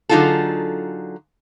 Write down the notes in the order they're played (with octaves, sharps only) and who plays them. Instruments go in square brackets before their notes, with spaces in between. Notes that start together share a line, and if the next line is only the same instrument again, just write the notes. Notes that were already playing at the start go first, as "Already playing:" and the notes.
[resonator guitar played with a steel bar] D3 F#3 D#4 F4 G#4 A4